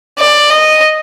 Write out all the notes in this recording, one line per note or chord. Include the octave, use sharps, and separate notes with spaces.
D5
D#5